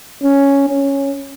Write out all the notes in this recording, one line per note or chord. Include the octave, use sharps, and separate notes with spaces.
C#4
C#4